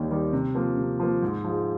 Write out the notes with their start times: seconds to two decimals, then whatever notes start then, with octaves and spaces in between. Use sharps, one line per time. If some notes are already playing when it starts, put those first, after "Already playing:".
Already playing: D#2 D#3 G3
0.11 D#3 G3
0.33 C3
0.55 F3 A#3
0.77 C3
1.00 F3 A#3
1.22 G#2
1.44 F3 G#3